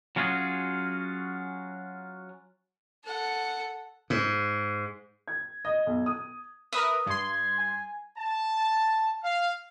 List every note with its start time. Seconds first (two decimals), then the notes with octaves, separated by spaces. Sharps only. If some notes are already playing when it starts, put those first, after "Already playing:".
0.16 F#3 C#4 F4 F#4 G#4
3.04 A4 F#5
4.10 G#2
5.28 G#6
5.65 D#5
5.87 B1
6.06 D#6
6.73 A#4 B4 E5 D#6
7.06 G2 C6 G#6
7.58 G#5
8.17 A5
9.23 F5